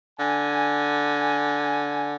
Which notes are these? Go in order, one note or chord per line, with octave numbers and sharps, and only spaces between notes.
D3 G#5